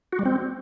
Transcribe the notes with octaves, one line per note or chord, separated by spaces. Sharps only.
F#4
G3
C4